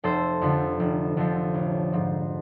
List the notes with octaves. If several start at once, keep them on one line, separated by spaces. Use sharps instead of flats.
F1 A4 C5
F2 D3 F3
F1
F2 D3 F3
A1
G#2 F3